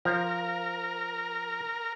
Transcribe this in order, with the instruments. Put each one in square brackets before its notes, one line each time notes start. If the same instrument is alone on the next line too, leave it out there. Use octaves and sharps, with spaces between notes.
[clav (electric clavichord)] F3 [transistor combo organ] A#4